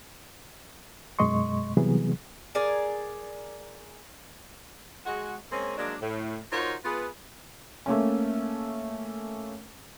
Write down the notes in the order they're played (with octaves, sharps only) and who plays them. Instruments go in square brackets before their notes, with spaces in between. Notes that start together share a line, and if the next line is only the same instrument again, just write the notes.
[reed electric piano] F#2 B2 G#3 D#5 C6 C#6
C3 E3 F#3 G3 B3 G#4
[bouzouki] G#4 A#4 D5 G#5
[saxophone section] G#3 F#4
G#3 A#3 C4 C#4
F#3 G#3 A#3 D4
A2
D#4 F4 F#4 A#4 C5 C#5
B3 F4 G#4 B4
[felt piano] A3 A#3 C#4